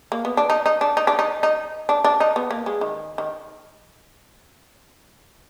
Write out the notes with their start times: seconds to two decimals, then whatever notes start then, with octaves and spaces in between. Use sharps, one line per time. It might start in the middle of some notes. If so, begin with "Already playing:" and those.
0.12 A#3
0.25 B3
0.37 D4
0.50 D#4
0.66 D#4
0.81 D4
0.97 D#4
1.07 D4
1.19 D#4
1.43 D#4
1.89 D4
2.04 D4
2.20 D#4
2.36 B3
2.51 A#3
2.66 G#3
2.81 D#3
3.18 D#3